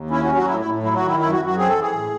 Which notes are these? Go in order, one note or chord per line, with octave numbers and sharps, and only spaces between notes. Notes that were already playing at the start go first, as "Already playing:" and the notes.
Already playing: D#2
C#4 E4
F#4
F#3
F#4
A2 E4
E4
A2
F#3 E4
F#4
D#3
E4
F#2 E4
F#4
F#2
F#4
C4 G#4
A4
E3
G#4
A2